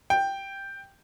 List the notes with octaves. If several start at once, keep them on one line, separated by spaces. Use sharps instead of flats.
G5